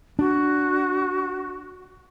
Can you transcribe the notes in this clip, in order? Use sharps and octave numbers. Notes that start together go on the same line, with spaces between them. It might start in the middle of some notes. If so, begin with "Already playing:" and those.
D4 F#4